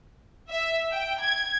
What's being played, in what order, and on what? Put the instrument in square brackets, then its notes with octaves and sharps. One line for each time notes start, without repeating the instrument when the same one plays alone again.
[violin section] E5
G5
G#6